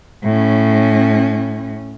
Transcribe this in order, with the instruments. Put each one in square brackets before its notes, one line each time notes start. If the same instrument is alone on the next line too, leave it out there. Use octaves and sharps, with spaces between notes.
[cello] A2 C#4